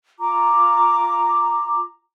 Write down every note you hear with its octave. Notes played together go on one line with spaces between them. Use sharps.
F4 A#5 D6